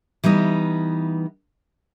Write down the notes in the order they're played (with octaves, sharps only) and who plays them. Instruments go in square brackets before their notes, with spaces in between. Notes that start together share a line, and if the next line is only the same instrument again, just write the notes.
[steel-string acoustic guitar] E3 G3 B3 D#4